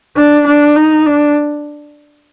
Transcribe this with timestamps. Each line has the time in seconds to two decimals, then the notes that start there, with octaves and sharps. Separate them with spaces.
0.17 D4
0.46 D4
0.76 D#4
1.06 D4